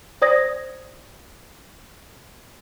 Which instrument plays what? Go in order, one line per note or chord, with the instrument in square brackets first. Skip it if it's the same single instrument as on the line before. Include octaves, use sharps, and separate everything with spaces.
[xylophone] C5 D5 D#6 G#6 A#6